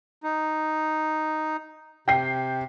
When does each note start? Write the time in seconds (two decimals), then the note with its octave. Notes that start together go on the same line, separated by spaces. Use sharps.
0.23 D#4
2.08 C3 G5 C7